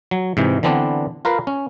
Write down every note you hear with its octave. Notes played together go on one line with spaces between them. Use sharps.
F#3
G#2 C3 E3
D3 E3 B3 C4 D4
F4 A#4 B4 F5
C#4